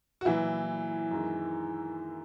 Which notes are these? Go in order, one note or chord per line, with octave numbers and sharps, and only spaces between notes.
F#4
A#2 E3 F#3 E4
F#2 D#3 G#3